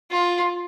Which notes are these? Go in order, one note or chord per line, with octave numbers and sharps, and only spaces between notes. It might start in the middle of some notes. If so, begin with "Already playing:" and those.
F4